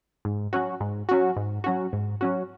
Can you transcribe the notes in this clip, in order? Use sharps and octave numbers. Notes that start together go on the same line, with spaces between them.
G#2
F#3 C#4 F#4
G#2
F#3 C#4 F#4
G#2
F#3 C#4 F#4
G#2
F#3 C#4 F#4